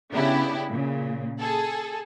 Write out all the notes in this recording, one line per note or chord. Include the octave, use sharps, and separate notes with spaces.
C#3 B3 D4 E4 G4
A#2 C#3
G#4 A4